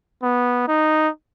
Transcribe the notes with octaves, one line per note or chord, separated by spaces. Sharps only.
B3
D#4